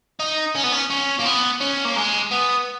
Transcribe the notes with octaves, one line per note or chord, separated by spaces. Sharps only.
D#4
C#4
B3
C#4
C#4
A#3
B3
C#4
A#3
G#3
B3